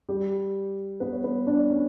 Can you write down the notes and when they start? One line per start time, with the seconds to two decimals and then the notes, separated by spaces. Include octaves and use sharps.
0.09 G3 G4
1.00 B3 B4
1.12 C#5
1.24 B3 B4
1.47 D4 D5
1.70 C#4 C#5